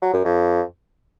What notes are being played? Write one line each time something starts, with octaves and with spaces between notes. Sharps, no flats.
F#3
F#2
F2